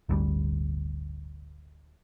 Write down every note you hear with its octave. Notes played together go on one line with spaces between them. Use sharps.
D1 G1 D2 G3